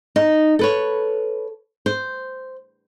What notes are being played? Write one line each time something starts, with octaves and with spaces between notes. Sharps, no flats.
D#4
A4 B4 C#5
C5